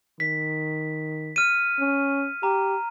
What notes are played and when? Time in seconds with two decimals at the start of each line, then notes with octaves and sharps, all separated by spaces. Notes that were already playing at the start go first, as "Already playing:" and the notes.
0.20 D#3 B6
1.36 F6 D#7
1.80 C#4
2.43 G4 A#5